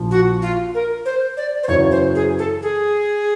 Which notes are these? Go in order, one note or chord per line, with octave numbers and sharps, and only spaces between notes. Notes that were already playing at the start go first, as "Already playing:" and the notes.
Already playing: A#1 A#2 F3
F#4
F4
A#4
C5
D5
C5
F#2 C#3 E3 C#5
C5
G#4
A4
G#4